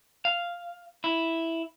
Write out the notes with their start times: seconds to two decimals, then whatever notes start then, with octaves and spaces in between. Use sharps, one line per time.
0.25 F5
1.04 E4